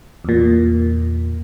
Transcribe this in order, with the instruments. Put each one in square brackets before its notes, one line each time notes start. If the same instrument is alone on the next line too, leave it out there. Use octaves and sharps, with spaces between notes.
[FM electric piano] E2 A#2